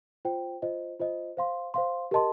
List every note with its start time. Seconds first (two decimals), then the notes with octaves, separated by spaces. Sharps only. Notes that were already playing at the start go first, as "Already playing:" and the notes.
0.25 F4 C5 G5
0.62 F4 C5 D#5
1.00 F4 C5 D#5
1.37 C5 F5 C6
1.74 C5 F5 C6
2.11 G4 A#4 D#5 A5 C6